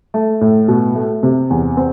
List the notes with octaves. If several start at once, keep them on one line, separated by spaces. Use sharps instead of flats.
A3
A2
B2
A3
C3
E2
C4